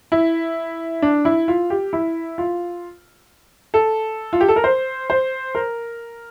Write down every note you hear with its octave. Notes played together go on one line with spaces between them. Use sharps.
E4
D4
E4
F4
G4
E4
F4
A4
F4
G4
A4
A#4
C5
C5
A#4